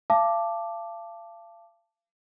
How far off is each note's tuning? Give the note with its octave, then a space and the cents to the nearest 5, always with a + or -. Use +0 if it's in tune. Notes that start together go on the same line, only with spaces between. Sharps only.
F5 -35 A5 +0 D6 +0